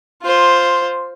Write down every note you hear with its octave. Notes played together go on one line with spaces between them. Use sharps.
F4 C5